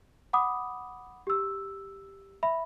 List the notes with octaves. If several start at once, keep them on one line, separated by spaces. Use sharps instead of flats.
F#5 B5 D6 D#6
G4 E6
E5 B5